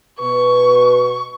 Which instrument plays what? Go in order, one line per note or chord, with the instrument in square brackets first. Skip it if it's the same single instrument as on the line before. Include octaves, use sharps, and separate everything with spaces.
[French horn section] B2 B4 [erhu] C#6